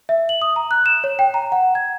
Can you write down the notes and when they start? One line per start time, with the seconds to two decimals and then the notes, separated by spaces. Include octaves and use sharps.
0.09 E5
0.29 F#7
0.42 D#6
0.56 A#5
0.71 F#6
0.86 E7
1.04 C#5
1.19 G5
1.34 A#5
1.52 F#5
1.75 G#6